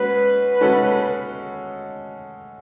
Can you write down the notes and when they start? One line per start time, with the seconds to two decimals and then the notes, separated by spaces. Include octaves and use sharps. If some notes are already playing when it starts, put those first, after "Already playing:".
Already playing: G#3 C#4 F#4 B4
0.60 G#3 C#4 F#4 A4